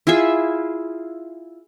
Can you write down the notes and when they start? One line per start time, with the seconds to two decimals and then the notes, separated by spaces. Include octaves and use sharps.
0.07 E4 F4 G#4 E5